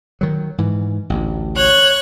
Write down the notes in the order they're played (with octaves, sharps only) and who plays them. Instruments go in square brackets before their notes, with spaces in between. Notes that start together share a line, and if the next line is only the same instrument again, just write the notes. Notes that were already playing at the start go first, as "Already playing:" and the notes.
[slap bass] D#3 F#3
G#2 E3
A1 D2
[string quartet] C#5 F#6